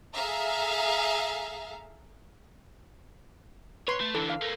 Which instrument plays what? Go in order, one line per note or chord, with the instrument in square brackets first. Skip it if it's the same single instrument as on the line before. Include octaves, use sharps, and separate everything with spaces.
[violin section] G#4 A4 E5 F5 A#5
[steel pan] B4 C6 [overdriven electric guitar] C#5
[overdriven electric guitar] A3
[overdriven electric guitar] D3 E3 [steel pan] A4
[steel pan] F5
[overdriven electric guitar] A3 A#3